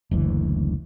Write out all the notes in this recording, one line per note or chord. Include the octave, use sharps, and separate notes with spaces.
F#1 D2 E3